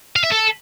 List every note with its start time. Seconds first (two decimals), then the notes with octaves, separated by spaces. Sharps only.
0.16 F5
0.24 E5
0.31 A4